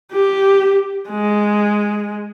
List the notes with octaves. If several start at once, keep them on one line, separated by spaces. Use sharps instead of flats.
G4
G#3